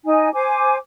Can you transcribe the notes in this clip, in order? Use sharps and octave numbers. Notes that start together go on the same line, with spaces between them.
D#4 G#5
C5 G#5 D6